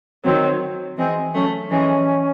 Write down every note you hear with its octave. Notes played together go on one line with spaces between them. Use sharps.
D#3 F#3 C4
E3 G#3 C4
F#3 A3 C#4
E3 G#3 C#4